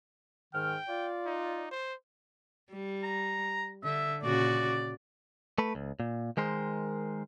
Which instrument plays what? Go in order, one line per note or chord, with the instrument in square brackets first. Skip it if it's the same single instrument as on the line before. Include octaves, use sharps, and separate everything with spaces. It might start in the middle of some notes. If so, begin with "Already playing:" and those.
[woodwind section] G#2 D#3 F6 [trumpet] G5
[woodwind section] F4 D5
[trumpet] D#4
C5
[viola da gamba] G3
[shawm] A#5
[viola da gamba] D3 [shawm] E5
[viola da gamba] A#2 C#3 F#4 [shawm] D5
[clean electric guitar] A3 B4
C#2
A#2
D#3 G#3 A#4 C5